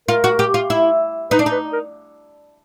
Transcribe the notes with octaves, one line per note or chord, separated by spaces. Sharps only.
F4 A#4
F#4
G4
F4
E4
D#4 B4
D4
D#4
B4
A#4